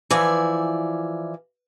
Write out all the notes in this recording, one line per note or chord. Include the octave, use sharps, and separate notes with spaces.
E3 F3 D5 E5 G#5